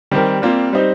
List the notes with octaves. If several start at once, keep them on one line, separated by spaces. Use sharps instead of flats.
D#3 G3 C4 G4 A#4
G3 A#3 C4 F4
G3 C4 D#4 C5